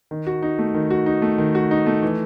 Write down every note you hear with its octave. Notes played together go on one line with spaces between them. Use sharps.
D#3
F#4
D#4
A3
D#3
F#4
D#4
A3
D#3
F#4
D#4
A3
E3